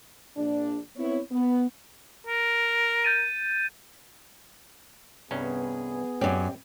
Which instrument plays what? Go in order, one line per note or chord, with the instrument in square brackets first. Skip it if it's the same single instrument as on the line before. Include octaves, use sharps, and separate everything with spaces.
[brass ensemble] A#1 D4
B3 C4 E4 C#5
B3
[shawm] A#4
[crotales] G6 A6 D#7
[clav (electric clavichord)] C2 G2 C#4 [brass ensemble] B3 G#4
[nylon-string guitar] F#2 C#4 [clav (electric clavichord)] C4 G4 D5